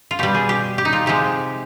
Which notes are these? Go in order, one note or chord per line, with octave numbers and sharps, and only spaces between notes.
F4
B2 G3 G4
G#4
G4
G4
D#4
F4
C3 F3 G#3 G4